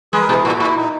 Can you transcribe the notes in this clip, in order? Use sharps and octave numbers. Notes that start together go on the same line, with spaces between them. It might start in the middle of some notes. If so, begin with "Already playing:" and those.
G#3 G#4 B4
A#4
B2 E4 G#4
A#2 F#4
A#2 E4
D#4